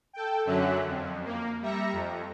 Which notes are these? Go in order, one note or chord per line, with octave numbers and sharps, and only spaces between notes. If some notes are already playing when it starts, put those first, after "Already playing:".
A4 G5
F#2 D3 F#3 C#4 E5 F#6
F2
A#3
G3 E5 A#5 A#6 C#7
F2